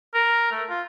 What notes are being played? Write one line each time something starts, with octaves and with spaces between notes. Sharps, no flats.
A#4
A3
F4